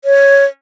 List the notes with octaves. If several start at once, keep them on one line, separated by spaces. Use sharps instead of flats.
C#5